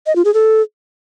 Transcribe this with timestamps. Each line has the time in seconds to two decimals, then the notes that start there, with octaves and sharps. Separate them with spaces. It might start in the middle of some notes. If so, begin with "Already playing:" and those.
0.07 D#5
0.16 F4
0.25 G#4
0.34 A4